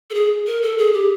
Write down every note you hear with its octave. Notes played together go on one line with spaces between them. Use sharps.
A4
G#4
A#4
A4
G#4
G4